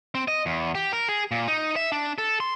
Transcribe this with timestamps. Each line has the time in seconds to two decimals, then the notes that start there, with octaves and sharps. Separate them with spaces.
0.15 C4
0.28 D#5
0.46 E2
0.75 G4
0.93 A#4
1.08 G#4
1.31 A#2
1.48 D#4
1.76 E5
1.92 D4
2.18 A4
2.40 C6